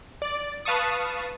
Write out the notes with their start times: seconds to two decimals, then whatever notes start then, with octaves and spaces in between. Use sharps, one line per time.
0.22 D5
0.65 B4 F5 A5 C#6 D#6